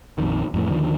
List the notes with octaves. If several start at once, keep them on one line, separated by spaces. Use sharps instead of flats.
A#1 F2 D#3
F2 A2 E3
D#2 D3 D#3 F3